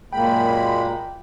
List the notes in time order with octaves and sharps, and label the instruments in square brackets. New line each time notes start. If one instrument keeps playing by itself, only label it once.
[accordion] F#2 G#3 B5 [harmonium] A#2 A#3 [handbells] G5